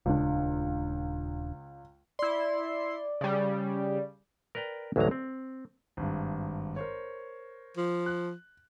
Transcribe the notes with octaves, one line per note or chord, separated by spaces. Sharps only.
D#1 C#2 D4
E4 D5 C6
C#3 G3
A#4 B4 D5 G5 A#5
A1 D2 F#3 G#3 A#3 A#5
C4
G#1 G2
A#4 C5 C#5
F3
F#6